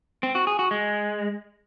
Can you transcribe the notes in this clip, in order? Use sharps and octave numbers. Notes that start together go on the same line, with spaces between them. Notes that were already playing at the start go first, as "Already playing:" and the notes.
C4
F#4
G#4
F#4
G#3